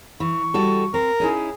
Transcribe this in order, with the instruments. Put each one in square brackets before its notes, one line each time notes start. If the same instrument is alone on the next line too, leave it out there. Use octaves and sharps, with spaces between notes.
[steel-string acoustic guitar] E3 [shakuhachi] C#6
[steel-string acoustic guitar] G3 F#4 A4
[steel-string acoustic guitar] C4 [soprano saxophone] A#4
[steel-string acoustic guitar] C#4 D#4 E4 [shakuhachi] G#4